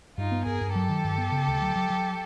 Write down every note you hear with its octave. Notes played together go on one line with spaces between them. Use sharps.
G2 D#4 F4
B3
G2 G#4 A#4
G2
F#3 G4 A4
D#3
G2
B3
C#3
D2
F#3
F#3
F#3